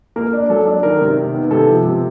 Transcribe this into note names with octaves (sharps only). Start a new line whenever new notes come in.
A#3 A#4
D4
F#3 A4
D4
D#3 A#4
C3
D#3
B3
C3 A4
F3
C3